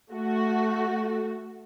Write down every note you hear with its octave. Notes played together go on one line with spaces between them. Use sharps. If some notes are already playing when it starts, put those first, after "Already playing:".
A3 F#4